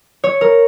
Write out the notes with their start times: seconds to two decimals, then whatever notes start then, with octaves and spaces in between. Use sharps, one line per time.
0.24 C#5
0.41 A#4